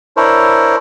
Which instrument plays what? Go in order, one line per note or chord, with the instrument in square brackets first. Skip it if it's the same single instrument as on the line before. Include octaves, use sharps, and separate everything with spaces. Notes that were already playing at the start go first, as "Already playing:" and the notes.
[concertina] D4 E4 A#4 C5 C#5